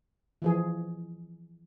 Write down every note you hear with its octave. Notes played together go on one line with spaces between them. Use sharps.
E3 F3 G#4